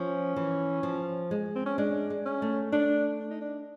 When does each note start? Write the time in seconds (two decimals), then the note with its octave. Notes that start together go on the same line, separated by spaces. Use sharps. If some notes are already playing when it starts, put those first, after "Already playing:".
Already playing: F3 C#4
0.36 E3
0.83 F3
1.31 G#3
1.56 C4
1.66 C#4
1.78 G#3 D4
2.10 G#3
2.26 C#4
2.42 A3
2.72 A3 D4
3.20 D4
3.30 D#4
3.41 D4